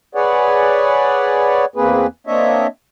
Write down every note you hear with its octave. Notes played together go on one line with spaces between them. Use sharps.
G#4 B4 C#5 D5 F#5
E2 A#3 C4 G#4 B4
A#3 C4 D4 C#5 D#5 E5